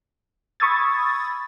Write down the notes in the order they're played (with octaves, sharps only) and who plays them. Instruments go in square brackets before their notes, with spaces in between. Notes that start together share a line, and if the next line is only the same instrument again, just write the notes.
[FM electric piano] B5 C#6 D#6 E6 G#6 A6